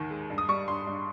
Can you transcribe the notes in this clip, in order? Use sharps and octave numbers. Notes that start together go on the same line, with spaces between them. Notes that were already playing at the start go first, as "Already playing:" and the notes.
Already playing: D#2 D#3
G#3
G2
D#6
G3 C#6
G2 C6
G2